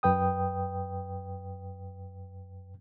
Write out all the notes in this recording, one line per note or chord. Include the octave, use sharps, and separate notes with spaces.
F#2 B4 G5 D#6